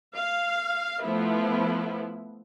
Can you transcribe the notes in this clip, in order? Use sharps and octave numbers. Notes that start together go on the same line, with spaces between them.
F5
F3 A3 B3 E4